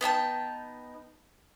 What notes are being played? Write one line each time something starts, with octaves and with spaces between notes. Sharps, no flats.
B3 D#4 G5 A5